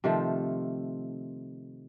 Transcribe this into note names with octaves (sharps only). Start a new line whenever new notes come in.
C3 D#3 F3 A3